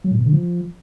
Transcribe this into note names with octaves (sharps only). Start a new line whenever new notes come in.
F#3
A2
B2
D3
F3